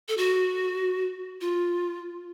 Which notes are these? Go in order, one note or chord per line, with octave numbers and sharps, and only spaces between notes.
A4
F#4
F4